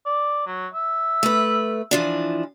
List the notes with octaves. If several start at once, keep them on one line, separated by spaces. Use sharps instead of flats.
D5
F#3
E5
A3 B4
E3 F3 D4